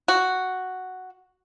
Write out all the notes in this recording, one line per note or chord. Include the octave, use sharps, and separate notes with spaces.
F#4